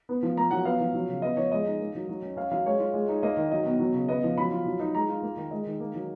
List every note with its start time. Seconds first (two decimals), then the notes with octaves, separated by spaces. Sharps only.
0.09 B3
0.23 F3
0.37 A#3 A#5
0.51 F#3 F#5
0.65 B3 F5
0.80 F3
0.94 F#3
1.08 C#3
1.22 B3 D#5
1.37 F3 C#5
1.52 G#3 D#5
1.66 D#4
1.81 A#3
1.95 F#3
2.09 F#3
2.22 C#4
2.37 C#4 F5
2.51 F#3 F5
2.66 G#3 C#5
2.80 F4
2.94 G#3
3.08 D#4
3.23 A#3 D#5
3.37 D#3
3.51 F#3 D#5
3.66 B2
3.80 F#3
3.94 C#3
4.08 B3 D#5
4.24 F3
4.38 F#3 B5
4.52 F4
4.66 F#3
4.79 D#4
4.94 G#3 A#5
5.09 F4
5.23 A#3
5.37 D#3
5.51 G#3 D#5
5.66 D#3
5.80 A#3
5.94 F#3